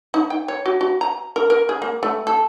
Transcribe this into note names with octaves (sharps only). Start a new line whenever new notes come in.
D#4
G5
C#5
F#4
F#4
A#5
A#4
A#4
G#4
A#3
A3
A4